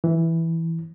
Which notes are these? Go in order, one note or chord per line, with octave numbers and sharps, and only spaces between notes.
E3